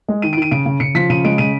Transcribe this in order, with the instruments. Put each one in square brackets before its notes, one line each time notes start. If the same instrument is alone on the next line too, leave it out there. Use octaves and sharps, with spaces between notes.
[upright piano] G#3
D#3 D#7
D7
D#3 D#7
C#3 D7
C#3
C#3 C#7
F3 B6
C#3 D#7
G#3 D7
C#3 D#7